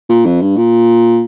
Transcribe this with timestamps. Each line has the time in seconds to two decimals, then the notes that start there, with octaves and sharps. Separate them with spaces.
0.09 A#2
0.25 F2
0.41 G2
0.57 A#2